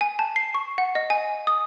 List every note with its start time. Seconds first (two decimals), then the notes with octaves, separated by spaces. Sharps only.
0.01 G#5
0.19 A5
0.36 C7
0.54 C#6
0.78 F#5
0.95 D#5
1.10 G#5
1.47 D#6